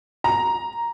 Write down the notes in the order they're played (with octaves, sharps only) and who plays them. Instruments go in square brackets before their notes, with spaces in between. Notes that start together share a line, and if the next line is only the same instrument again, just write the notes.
[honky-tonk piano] A#5